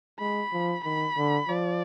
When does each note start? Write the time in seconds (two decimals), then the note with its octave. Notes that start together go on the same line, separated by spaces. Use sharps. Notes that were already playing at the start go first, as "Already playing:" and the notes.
0.20 G#3 B5
0.52 F3
0.84 D#3 B5
1.17 D3
1.48 F3 D5